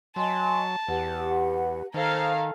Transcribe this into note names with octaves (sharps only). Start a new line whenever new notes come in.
F#3 D#5 G#5 A5 C6
E2 G4 B4 F#5
D#3 A4 C5 F5 G#5 A#5